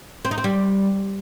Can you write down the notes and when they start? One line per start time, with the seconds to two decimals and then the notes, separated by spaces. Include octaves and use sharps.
0.25 C4
0.31 D#4
0.38 C4
0.44 G3